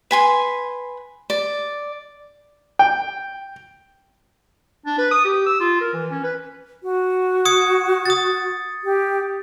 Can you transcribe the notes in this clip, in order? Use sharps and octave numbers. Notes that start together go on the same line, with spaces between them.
B4 G#5 C6
D5
G5
D4
B4
D#6
G4
E6
F4
A#4
E3
C#4
B4
F#4
D#6 G#6 C#7
D#6 A6
G4